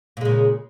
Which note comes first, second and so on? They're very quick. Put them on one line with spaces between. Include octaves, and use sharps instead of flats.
A#2 G#3 C#3